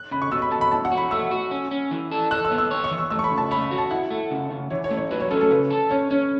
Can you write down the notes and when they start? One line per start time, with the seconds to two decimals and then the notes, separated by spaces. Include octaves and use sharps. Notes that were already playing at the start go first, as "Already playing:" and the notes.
Already playing: F#6
0.11 C#3 B5
0.22 C#6
0.32 B2 E6
0.42 B5
0.51 B2 A5
0.61 B5
0.71 E2 A5
0.85 F#5
0.92 F#4
0.97 B5
1.11 A3 E6
1.31 F#4
1.51 C#4
1.71 C#4
1.91 E3
2.11 A4
2.31 A4 F#6
2.45 E6
2.51 B3
2.58 E6
2.71 C#5
2.84 C#6
2.91 E3
2.98 E6
3.10 A3 E6
3.19 C#6
3.24 B5
3.31 C#3
3.38 A5
3.51 C#5 B5
3.64 B5
3.71 F#4
3.78 A5
3.91 E4 F#5
4.11 A3
4.31 C#3
4.51 C#3
4.70 E3 C#5
4.84 C#5
4.91 A3
4.97 C#5
5.11 F#3 B4
5.20 C#5
5.31 C#4 A4
5.41 A4
5.51 C#3 B4
5.70 A4
5.90 C#4 C#5
6.11 C#4 C#5